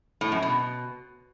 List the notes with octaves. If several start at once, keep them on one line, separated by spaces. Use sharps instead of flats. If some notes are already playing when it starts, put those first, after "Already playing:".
A2
F#2
B2